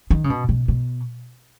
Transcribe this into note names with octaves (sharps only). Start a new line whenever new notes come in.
D#3
C#3
B2
B2
B2